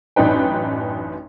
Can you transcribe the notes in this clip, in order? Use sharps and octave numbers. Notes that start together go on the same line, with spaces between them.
A1 F#2 D4 D#4 B4 G5